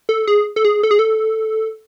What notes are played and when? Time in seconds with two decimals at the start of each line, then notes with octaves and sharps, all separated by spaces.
0.09 A4
0.27 G#4
0.56 A4
0.65 G#4
0.83 A4
0.91 G#4
0.99 A4